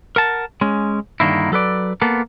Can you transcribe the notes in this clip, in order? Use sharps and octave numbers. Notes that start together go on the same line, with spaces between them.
A#4 F#5 A5
G#3 C#4
G2 D3 D#3 A#3 E4
F#3 A4 B4 D5
A#3 B3 A4